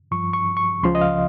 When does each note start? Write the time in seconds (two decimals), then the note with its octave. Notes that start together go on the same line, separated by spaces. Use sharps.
0.11 G2 F3 C#6
0.33 C#6
0.57 C#6
0.83 C#2 C#3 F3 C6
0.95 D#5
1.01 F5